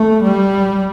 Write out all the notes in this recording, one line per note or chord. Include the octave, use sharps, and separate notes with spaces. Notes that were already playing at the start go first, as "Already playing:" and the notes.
Already playing: A3
G3